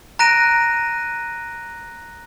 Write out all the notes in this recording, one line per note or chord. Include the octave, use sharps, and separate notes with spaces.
A#5 F#6 A#6 D7 D#7